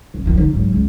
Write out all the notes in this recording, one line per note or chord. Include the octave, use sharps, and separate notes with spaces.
D#1
D#3 F3
D3 D#4
G#2 F#3
C#2